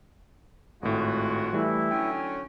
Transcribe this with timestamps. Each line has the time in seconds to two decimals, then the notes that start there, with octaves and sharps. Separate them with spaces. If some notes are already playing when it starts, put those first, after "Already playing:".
0.83 G#1 A2 G#3 F4 F#4
1.53 E3 G3 A3 E4
1.91 D3 F#3 C#4 G5